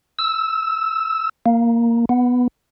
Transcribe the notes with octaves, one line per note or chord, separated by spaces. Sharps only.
E6
A#3
B3